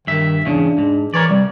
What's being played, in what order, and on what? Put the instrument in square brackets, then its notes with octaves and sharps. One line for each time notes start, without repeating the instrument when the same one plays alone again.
[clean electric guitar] G2 E5 [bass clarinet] D#3
[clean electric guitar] E2 G#2 C#3 [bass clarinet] D4
[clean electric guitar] G#2
[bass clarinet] E3 [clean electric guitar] A#4 C#5 D5
[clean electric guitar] C2 [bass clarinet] G3